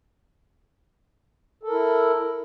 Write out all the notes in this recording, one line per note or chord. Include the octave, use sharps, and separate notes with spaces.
E4 A4 A#4